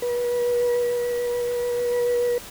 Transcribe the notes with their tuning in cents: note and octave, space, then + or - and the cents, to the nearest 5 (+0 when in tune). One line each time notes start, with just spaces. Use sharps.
B4 -35